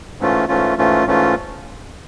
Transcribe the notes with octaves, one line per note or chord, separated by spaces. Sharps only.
G#2 E3 A3 C#4 F4
G#2 E3 A3 C#4 F4
G#2 E3 A3 C#4 F4
G#2 E3 A3 C#4 F4